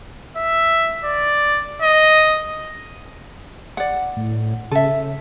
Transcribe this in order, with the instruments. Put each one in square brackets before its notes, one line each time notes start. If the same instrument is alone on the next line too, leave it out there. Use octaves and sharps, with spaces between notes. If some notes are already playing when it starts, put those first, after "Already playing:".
[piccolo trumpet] E5
D5
D#5
[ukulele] D5 F#5
[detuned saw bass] A2
[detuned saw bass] C#3 [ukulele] A4 E5